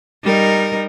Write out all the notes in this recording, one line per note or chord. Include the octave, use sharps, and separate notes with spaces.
G3 D#4 A#4